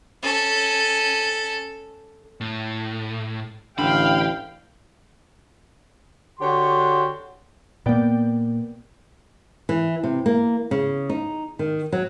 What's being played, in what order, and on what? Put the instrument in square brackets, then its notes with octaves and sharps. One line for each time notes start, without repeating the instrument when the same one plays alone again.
[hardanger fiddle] C#4 A4
[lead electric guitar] A2
[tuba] A1 [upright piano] D3 [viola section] F5 G5 [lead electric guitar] B5
[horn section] D3 F#4 G4 C#5 C6
[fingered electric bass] A#2 A#3 [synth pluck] B3 D5 G5
[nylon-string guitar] E3
C3
A#3
C#3
D#4
D#3
F#3